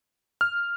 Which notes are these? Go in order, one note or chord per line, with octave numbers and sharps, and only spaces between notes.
F6